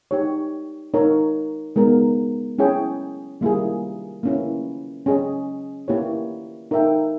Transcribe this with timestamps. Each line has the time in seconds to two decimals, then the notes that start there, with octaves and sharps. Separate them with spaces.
0.11 D#4 G4 C#5
0.94 D#4 A#4 C#5
1.76 G#3 B3 D#4 A#4
2.58 C#4 E4 G#4 C#5 G5
3.41 G3 A#3 E4 G#4
4.23 A#3 C#4 E4
5.06 C#4 G#4 D#5
5.88 A#3 E4 G4 C#5
6.71 D#4 A#4 E5 G5